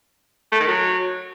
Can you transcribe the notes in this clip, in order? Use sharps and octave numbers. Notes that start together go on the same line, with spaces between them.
A3
D#3
F#3